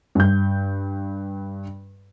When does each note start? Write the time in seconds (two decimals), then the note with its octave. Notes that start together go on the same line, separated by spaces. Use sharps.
0.15 G2 G6